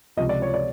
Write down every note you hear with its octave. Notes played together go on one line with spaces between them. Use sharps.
C#2 C3 F3 D#5
D5
C#5
D5